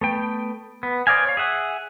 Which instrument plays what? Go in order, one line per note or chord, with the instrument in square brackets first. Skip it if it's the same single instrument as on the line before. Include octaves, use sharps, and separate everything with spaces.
[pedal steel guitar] A3 B3 G5
B3
C5 D5 D#5 F5 G#5
C#5 F5
G#4 E5 F#5 G#5